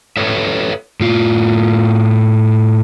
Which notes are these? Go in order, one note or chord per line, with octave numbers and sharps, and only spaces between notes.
A4 B4 C#5 E5
A2 F4